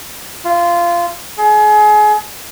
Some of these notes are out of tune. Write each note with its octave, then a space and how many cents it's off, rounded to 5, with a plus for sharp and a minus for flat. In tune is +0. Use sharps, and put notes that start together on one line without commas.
F4 -15
G#4 +30